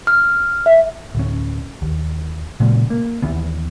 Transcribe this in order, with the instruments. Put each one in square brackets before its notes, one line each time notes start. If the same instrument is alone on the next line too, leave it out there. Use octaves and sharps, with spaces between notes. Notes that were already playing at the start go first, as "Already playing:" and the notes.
[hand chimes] F6
E5
[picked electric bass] D1 C#4
D#2
A#2 C#3 F#3 G#3
A#3
D#2 E3 B3